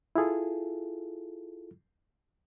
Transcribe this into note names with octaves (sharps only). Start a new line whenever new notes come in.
E4 F4 G#4 A4